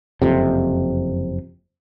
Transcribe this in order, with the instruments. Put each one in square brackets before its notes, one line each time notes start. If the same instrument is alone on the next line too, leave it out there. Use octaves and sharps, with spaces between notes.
[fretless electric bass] F#1 F2 C3